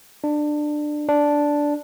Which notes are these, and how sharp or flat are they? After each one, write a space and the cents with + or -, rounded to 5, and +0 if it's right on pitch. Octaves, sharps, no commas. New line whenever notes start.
D4 +20
D4 -5